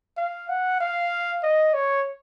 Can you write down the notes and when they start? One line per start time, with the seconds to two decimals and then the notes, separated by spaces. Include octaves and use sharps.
0.17 F5
0.49 F#5
0.80 F5
1.43 D#5
1.74 C#5